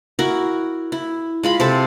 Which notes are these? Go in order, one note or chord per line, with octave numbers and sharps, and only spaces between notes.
E4 F#4 A#4
E4
G#3 F4 B5
C3 A4 A5